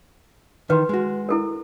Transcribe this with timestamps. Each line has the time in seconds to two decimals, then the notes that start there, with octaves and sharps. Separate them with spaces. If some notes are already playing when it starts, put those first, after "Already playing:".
0.70 D#3 E3 B4 C6
0.89 G#3 F#4
1.29 E4 A4 A#4